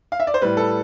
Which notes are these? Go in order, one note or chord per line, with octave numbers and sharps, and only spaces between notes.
F5
E5
D5
C5
A2 G3 B4
A4